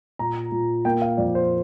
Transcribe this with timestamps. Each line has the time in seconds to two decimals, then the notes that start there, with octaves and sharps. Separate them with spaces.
0.19 A#2 A#5
0.52 A#2
0.85 A#3 G5
1.02 F5
1.17 F2 D5
1.35 C5